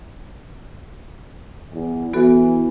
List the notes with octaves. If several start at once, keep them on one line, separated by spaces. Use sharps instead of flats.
E2
E3 B3 F#4 A4